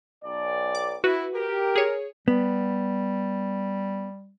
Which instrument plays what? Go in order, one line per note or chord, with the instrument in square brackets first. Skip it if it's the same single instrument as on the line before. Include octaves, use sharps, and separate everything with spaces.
[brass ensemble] B1 D5
[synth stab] D6
[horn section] E4 [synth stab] F#4 B4
[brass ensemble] G4 [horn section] A#4
[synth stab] G#4 C#5
[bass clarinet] G3 [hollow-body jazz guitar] B3